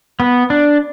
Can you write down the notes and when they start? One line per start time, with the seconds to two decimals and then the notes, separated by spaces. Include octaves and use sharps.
0.20 B3
0.50 D4